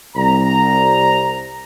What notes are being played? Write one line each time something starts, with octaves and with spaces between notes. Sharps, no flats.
C2 A#5